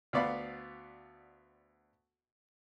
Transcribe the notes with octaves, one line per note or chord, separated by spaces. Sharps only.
D2 B3 D5 F5 B5